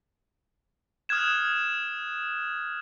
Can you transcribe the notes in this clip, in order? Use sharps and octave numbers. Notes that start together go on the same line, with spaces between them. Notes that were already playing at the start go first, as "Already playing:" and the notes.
D#6 F6 F#6 G#6 E7